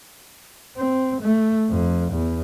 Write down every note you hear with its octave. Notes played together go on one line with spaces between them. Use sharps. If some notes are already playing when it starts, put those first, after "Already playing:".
C4
A3
F2
E2